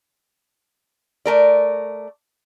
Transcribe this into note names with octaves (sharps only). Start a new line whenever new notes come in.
A3 A#4 D5